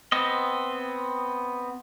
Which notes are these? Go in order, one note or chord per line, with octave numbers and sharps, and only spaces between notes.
B3 C4 D#5